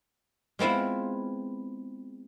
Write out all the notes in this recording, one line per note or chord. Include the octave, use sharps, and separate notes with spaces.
G#3 B3 C4 E4 F4